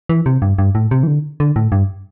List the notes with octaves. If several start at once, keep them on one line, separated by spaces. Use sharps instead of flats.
E3
C3
G2
G2
A2
C3
E3
D3
D3
A2
G2